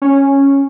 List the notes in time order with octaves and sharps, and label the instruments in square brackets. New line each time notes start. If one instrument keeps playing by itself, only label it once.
[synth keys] C#4